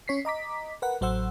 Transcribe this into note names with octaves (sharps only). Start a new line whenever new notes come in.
C#4 C#5 B6 C7
D#5 A#5 D6 B6
A#4 B4 F#5
A1 F#3 C5 F#5 E6